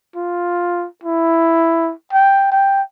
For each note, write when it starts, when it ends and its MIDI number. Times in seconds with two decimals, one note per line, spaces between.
0.16 0.86 65
1.04 1.93 64
2.13 2.51 79
2.52 2.82 79